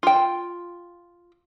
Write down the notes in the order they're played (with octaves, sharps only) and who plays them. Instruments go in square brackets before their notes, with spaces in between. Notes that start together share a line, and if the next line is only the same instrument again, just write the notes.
[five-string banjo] F4 G5